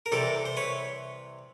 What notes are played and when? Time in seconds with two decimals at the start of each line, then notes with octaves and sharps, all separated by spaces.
0.06 A#4
0.12 C2 C3 E3 G4 A4
0.45 C5
0.57 B4 C#5